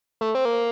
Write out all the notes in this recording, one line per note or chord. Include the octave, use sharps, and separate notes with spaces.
A3
C4
A#3